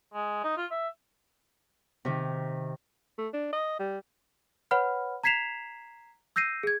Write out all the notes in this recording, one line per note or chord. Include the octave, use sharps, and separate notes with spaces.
G#3
D#4
F4
E5
C3 D#3
A3
D4
D#5
G3
B4 C#5 F#5 B5 F6
A#5 G#6 B6 C7 E7 F7
E6 G6 A#6 C7 D#7
G#4 G#6